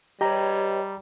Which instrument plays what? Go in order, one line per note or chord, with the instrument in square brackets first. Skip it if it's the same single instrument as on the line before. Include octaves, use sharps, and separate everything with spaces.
[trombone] G3 [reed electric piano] G4 A#5 [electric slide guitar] B4 C#5 D#5